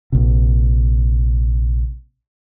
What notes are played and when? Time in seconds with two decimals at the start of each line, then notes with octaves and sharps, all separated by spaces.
0.12 A#1 C3